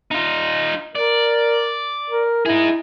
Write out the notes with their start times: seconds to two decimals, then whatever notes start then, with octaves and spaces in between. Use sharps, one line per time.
0.11 D#4 F4
0.95 A#4 D5
2.10 A#4
2.46 D#4 E4 G#4